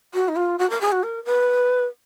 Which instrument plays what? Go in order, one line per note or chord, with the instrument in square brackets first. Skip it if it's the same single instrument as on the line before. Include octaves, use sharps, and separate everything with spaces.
[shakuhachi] F#4
D#4
F4
F#4
A#4
G#4
F#4
A#4
B4